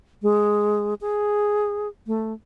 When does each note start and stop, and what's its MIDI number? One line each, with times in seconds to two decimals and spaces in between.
0.22 0.94 56
1.01 1.88 68
2.07 2.33 57